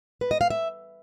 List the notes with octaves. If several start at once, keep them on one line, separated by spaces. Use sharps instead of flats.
B4
D#5
F5
E5